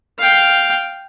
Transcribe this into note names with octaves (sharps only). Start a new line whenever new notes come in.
F5 G5